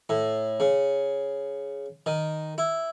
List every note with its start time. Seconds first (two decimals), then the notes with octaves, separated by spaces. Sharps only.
0.09 A2
0.60 C#3
2.06 D#3
2.58 E4